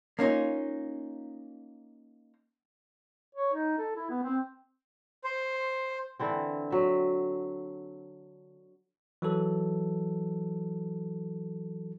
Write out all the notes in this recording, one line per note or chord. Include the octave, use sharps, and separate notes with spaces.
A#3 C#4 D#4 F4
C#5
D#4
A4
E4
B3
C4
C5
D3 E3 C4
F#3 E5
E3 F#3 A4